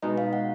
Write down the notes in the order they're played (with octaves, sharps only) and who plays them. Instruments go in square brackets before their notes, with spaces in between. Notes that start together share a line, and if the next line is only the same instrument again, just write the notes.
[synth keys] B2 G#3 D#4 [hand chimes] D#5
[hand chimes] F5
F#5